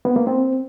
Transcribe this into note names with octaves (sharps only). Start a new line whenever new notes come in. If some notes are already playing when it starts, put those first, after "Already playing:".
B3
A#3
C4